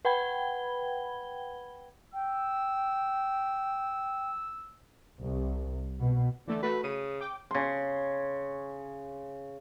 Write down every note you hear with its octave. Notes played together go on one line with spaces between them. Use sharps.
B4 F#5 G5 B5 G#6 G7
G5 E6
C2
B2
D3 E3 A3
A3 F#4 B4
C#3 D#7
G5 D6
C#3 C6